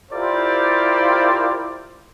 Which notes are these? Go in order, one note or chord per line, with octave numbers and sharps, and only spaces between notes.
E4 F4 G4 A#4 C5 D5